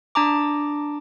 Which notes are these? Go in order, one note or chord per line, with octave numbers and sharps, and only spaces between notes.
D4 A5 A#5 D6